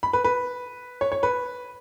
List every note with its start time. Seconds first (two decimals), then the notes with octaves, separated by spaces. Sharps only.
0.03 B5
0.13 B4
0.24 B4
1.01 C#5
1.12 C#5
1.23 B4